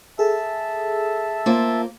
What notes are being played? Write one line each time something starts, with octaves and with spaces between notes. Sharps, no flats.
G#4 A4 E5 A5 E6
A#3 F4 C5